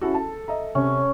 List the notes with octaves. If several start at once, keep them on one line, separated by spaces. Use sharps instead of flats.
C#4 E4 F#4 A4
A5
D#5 E5 A#5
C3 C#4